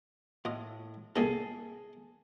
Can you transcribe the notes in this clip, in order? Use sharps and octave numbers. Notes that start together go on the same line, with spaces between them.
A2 F4 D#5
C2 A#2 G#4 A4 A#5